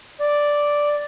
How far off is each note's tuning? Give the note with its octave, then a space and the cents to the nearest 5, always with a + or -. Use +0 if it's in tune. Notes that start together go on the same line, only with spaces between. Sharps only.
D5 +0